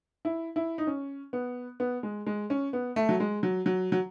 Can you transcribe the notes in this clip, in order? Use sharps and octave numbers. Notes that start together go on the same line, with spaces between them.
E4
E4
D#4
C#4
B3
B3
G#3
G#3
C#4
B3
A3
F#3
G#3
F#3
F#3
F#3